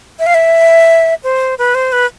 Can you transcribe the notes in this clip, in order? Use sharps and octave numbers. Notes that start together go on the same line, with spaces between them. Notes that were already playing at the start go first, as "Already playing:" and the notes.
E5
F5
E5
C5
B4
C5
B4